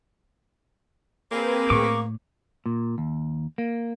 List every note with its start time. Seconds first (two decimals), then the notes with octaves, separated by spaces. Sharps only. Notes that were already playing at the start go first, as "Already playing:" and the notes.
1.30 A#3 C4 G#4 B4
1.70 A2 C#6 D6
2.66 A#2
2.98 D#2
3.58 A#3